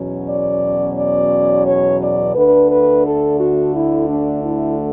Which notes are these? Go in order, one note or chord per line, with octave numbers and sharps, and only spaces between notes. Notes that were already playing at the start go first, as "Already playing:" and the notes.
Already playing: E2 B2 F#3 C#4
D5
D5
C#5
D5
D2 D3 A3 D4 B4
B4
A4
F#4
E4
D4
E4